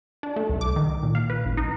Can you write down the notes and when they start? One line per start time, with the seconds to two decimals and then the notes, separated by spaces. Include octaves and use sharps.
0.23 D4
0.36 A3
0.49 C2
0.61 D6
0.76 D#3
1.03 A#2
1.15 F5
1.30 B4
1.45 A1
1.57 D#4